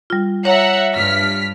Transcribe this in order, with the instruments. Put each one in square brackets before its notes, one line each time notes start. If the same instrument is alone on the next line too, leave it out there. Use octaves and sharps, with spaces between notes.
[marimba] G3 F4
[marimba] C#5 [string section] E5 F#5 A#5
[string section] G2 F6 B6